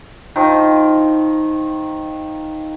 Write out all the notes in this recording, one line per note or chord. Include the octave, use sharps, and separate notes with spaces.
D#3 F3